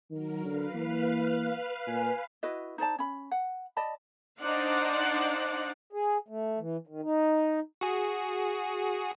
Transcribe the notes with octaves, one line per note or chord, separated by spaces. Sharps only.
D#3 F#3 A#4
D3 B4 F5
E3 A#3
A#2 G#5
E4 F#4 B4 D#5
D#4 C5 D5 A5
C#4 B5
F#5
D5 D#5 A5 B5
D4 D#4 C5 D5 F5 F#5
G#4
A3
E3
D#3
D#4
F#4 G#4